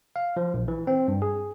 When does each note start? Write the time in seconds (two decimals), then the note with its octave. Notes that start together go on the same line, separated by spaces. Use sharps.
0.16 F5
0.37 F3
0.54 A#1
0.68 E3
0.87 C4
1.08 G2
1.22 G#4